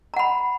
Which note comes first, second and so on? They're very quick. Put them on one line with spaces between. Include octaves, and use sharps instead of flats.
A#5 F#5 B5